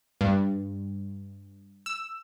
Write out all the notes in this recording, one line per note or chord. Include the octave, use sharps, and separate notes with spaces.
G2
E6